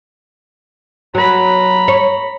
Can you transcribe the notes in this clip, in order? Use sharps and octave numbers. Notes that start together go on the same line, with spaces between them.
F#3 A#5 B5
C#5